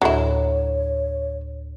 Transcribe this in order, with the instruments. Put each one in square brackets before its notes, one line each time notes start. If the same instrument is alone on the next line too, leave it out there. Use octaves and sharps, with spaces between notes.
[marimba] D2 A2 [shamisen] F#3 E4 [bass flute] C#5